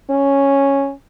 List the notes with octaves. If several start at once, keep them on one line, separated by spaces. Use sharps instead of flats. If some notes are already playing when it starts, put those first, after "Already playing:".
C#4